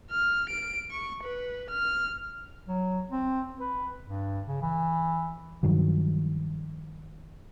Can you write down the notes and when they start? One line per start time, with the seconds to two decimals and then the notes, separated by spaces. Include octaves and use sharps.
0.11 F6
0.50 D7
0.91 C#6
1.24 B4
1.70 F6
2.68 F#3
3.11 C4
3.60 B4
4.05 G2
4.47 C#3
4.62 E3
5.63 G2 D#3 F3 F#3